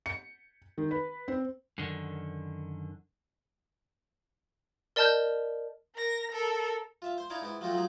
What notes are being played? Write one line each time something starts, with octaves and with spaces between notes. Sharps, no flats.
C#7
D#3
B4
C4
F#2 D3 D#3
A#4 D5 D#5 A5 F6 G6
A#4 A#6
A4 A#4
F4 E5 F5
C5 C6
D#4 E4 C#5 D5 F5
G#2 B3 E4
F3 F#3 A3 C4 F4 F#4
F3 F#3 D#4 G#4